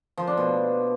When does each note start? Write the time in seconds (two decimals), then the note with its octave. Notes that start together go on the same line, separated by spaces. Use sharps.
0.17 F3
0.27 D4
0.37 B2